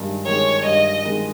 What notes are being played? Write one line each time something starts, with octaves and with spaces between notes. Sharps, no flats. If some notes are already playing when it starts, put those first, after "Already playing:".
Already playing: G2 D#3 G#3
D#3 G#3 C#5
G2 D#5
D#3 G#3